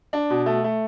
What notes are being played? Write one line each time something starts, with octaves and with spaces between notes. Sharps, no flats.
D4
B2
A3
A3